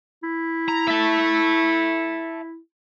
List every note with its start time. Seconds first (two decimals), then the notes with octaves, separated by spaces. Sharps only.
0.23 E4
0.69 A#5
0.88 E5 A5